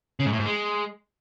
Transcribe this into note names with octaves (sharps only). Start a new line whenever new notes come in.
C#3
G#2
A2
G#2
G#3